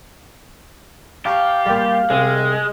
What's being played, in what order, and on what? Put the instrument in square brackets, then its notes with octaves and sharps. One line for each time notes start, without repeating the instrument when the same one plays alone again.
[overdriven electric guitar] G4 [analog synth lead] F5 [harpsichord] A5 A#5 C#6
[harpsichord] A#2 G3
[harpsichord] C2 [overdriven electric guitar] G#3